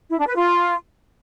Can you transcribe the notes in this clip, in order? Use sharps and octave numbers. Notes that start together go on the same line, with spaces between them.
E4
D4
B4
F4